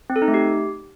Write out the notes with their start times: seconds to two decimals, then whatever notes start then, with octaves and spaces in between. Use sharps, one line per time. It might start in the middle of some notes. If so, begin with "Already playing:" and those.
0.10 C4
0.16 A4
0.22 D#4
0.28 A3
0.34 G4